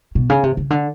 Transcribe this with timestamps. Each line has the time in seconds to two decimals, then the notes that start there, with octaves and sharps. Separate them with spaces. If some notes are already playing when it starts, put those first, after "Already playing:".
0.15 B2
0.29 C#3
0.43 C3
0.57 C#3
0.70 D3